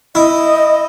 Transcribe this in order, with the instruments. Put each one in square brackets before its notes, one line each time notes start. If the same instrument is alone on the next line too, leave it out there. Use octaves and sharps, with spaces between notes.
[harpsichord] E4 [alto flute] D#5